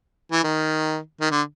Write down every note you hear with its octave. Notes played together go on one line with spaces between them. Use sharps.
E3
D#3
D#3
D3